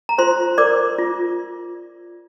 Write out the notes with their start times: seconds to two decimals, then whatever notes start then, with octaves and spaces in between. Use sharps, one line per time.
0.09 A#5
0.18 F4 C5 C6
0.58 A#4 D5 D6
0.99 F4